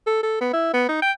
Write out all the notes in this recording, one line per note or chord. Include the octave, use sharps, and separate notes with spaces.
A4
A4
B3
E4
B3
D#4
G5